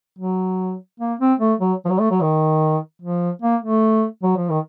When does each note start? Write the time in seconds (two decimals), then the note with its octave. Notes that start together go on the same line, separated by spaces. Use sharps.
0.19 F#3
1.00 A#3
1.19 C4
1.39 A3
1.59 F#3
1.85 F3
1.90 F#3
2.00 A3
2.11 F#3
2.21 D#3
3.02 F3
3.42 A#3
3.62 A3
4.23 F#3
4.37 F3
4.49 D#3